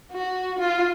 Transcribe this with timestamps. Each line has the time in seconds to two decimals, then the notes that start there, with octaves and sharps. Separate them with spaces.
0.12 F#4
0.59 F4